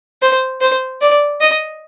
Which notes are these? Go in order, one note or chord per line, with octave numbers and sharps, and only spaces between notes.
C5
C5
D5
D#5